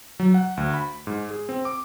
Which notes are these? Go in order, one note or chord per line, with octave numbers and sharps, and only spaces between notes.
F#3
F#5
D2
B5
G#2
G#4
C4
D6